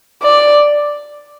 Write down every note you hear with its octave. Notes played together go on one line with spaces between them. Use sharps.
D5